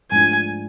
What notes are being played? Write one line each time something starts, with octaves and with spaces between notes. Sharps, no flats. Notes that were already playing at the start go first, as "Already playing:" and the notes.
G#2 F3 A3 D4 F4 G#5